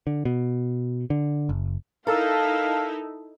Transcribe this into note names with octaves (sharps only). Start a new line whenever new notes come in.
D3
B2
D3
F#1
D#4 E4 A4 A#4 F5 A5 E6